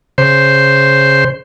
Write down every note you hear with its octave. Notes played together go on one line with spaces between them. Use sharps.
C#3 C5